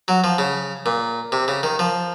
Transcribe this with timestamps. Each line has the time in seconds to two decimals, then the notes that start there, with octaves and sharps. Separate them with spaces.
0.08 F#3
0.24 F3
0.38 C#3
0.86 A#2
1.32 C3
1.48 C#3
1.63 D#3
1.79 F3